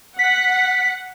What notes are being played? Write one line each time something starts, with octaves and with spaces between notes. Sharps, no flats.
F#5 B6